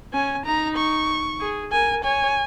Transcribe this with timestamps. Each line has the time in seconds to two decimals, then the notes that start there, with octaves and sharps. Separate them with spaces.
0.13 C#4 G#5
0.45 D#4 A#5
0.76 C#6
1.41 G#4
1.72 A#4 G#5
2.04 C#5 G#5